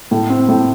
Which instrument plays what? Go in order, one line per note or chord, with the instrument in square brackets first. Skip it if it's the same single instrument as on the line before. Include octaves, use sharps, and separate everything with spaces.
[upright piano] A2
C4
A2